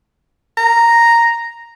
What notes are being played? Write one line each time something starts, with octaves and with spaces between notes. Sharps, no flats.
A#5